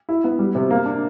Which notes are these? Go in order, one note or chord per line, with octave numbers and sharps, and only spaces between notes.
E4
B3
G3
C3
A#3
D4